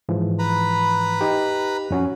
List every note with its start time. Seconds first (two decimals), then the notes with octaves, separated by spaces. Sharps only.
0.09 G#2 E3 F3
0.39 B4 A#5 B5
1.21 D#4 G4
1.91 F2 C#4 F#4